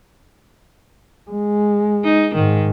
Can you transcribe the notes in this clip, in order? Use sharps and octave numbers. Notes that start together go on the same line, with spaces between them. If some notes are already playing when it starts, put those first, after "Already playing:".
G#3
D#4
G#2 D#3